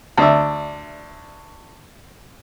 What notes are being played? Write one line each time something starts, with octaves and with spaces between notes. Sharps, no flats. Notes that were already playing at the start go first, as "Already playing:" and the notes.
D2 D4 E5